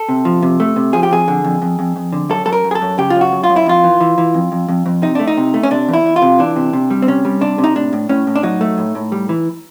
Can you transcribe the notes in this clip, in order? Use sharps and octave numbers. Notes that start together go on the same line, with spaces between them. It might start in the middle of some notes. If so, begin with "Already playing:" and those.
Already playing: A4
C3
F3
C3
A3
C3
F3 G#4
G4
F2 G#4
D3
F2
F2
F2
F2
D3
F#2 A4
F#2 A4
A#4
F#2
G#4
A4
F#2
C#3 G4
F4
F#2
F#4
F#2
F4
F#2
E4
F2 F4
E3
E3
E3
F2
F2
F2
F2
C3 D#4
A3 D4
D#4
C3
A3
C#4
C3 D4
E2
E4
E2
F4
C3
E3 D4
C3
C3
G3
C4
C3 C#4
G3
C3 D4
C3
D#4
A2 D4
A2
A2 C#4
A2
D4
F#3 D#4
A3
A2
A2
G3
E3